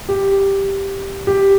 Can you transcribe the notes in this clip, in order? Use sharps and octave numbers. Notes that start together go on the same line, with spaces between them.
G4
G4